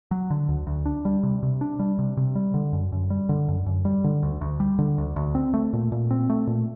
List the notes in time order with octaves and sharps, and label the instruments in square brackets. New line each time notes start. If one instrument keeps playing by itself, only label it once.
[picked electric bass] F#3
D3
D2
D2
D4
G3
C3
C3
D4
G3
C3
C3
G3
D3
F#2
F#2
G3
D3
F#2
F#2
G3
D3
D2
D2
G3
D3
D2
D2
C4
A3
A#2
A#2
C4
A3
A#2